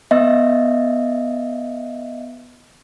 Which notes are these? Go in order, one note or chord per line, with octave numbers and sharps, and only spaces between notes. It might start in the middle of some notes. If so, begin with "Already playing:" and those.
B3 D#5 E5